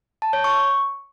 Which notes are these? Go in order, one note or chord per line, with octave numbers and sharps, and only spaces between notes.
A5
C#5
C#6